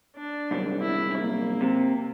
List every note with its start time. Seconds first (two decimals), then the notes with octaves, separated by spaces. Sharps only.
0.16 D4
0.51 C2 F#2
0.81 E4
1.18 A#3
1.61 C3